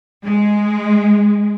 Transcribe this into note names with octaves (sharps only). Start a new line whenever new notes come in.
G#3